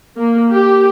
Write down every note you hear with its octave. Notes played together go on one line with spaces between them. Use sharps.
A#3
G4